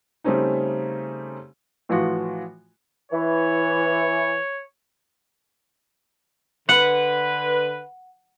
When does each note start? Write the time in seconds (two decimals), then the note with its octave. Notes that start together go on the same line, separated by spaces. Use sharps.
0.24 C#3 G3 A3 C4 C#4 D#4
1.89 A2 E3 F3 F4 F#4
3.12 E3 C#5
6.69 D3 B4 F#5